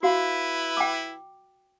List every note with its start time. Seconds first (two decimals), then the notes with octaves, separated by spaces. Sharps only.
0.03 E4 F#4 B4 F5
0.77 G5 D6